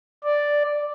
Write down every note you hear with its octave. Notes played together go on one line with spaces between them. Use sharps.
D5